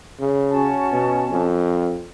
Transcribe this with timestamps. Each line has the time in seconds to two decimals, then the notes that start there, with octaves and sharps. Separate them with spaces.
0.20 C#3
0.51 C#4 F#4 A5
0.92 B2
1.31 F2